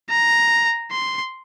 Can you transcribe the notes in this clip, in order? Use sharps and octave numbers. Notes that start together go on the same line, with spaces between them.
A#5
C6